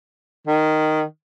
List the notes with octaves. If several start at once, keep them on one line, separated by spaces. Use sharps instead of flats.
D#3